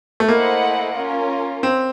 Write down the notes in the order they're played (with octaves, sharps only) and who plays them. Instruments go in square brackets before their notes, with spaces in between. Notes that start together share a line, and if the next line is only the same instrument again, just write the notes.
[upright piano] A3
[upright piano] A#3 [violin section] E4 A4 C5 D#5 F#5
[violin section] C#4 F4 A#4
[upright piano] C4